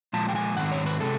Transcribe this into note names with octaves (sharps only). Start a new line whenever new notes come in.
A#2 F3 G#3 A5
G5
G#5
G#2 D#3 C4 F#5
C#5
B4
C3 D#3 G#3 A4